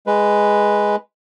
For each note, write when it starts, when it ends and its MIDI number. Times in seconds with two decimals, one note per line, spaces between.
0.07 0.96 56
0.07 0.96 71